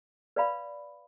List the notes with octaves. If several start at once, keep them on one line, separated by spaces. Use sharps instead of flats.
B4 D5 F5 B5